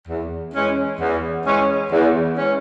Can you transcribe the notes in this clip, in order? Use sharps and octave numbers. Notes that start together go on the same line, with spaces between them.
E2
E3 G#3 C#4
E2
E3 G#3 C#4
E2
E3 G#3 C#4